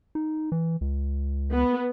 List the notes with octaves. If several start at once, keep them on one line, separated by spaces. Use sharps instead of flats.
D#4
E3
C#2
B3